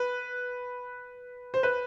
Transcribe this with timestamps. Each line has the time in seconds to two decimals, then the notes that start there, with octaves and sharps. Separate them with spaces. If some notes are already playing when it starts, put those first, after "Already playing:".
Already playing: B4
1.54 C5
1.63 B4